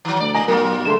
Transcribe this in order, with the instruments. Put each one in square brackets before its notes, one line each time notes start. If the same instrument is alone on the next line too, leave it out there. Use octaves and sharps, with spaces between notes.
[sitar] D#3 F#3
[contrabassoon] D2 [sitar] D5
[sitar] A3 [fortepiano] D#5 A#5 [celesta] G#5
[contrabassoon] B1 [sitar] F#3 A#3 F4 [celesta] A#4
[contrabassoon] D3 [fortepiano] G#3 A3 C6 [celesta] E7